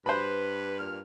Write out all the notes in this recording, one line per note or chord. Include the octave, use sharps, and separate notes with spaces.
G2 B4 C5 B5
A#2 F6